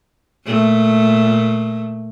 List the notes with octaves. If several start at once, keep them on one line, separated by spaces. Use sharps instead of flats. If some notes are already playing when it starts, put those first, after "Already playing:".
A#2 A3